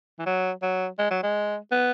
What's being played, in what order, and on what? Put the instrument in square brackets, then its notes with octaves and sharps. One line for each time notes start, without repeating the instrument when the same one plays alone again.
[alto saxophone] E3
F#3
F#3
G#3
F#3
G#3
B3